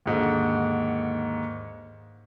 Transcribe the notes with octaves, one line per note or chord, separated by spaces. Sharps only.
D#2 G#2 D3